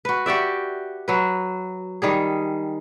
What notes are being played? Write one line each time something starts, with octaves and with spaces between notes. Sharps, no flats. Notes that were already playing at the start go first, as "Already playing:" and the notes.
F#4 B4
F#4 G4 D5 E5
F#3 B4
D#3 G3 G#4